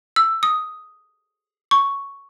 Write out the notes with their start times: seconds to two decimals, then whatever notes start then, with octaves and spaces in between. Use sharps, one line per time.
0.16 E6
0.43 D#6
1.71 C#6